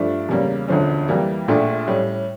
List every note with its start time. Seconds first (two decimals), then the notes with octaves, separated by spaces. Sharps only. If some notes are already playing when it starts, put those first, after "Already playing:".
Already playing: G2 F3 A3 D4
0.29 E2 C#3 G3 A#3 C#4
0.68 E1 D2 D3 F3 C#4
1.08 F2 E3 G3 A#3
1.48 A#1 A#2 A3 D4 F4
1.87 A2 G3 C#4